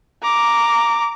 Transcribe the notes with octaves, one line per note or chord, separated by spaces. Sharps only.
A#5 D6